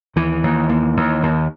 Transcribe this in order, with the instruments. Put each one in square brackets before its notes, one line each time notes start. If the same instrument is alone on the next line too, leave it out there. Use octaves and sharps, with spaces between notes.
[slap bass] D#2 E3
D#2
D#2
D#2
D#2